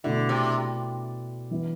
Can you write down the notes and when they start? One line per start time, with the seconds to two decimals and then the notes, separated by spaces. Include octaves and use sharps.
0.04 B2 D3 A3 E4
0.29 C3
1.51 E3 B3 E4